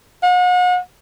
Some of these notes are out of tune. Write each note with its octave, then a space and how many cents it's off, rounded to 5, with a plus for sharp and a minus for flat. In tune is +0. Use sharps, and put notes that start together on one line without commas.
F#5 -40